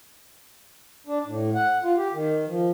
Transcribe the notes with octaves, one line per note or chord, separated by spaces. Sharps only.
D4
A2
F#5
F4
G4
D#3
F3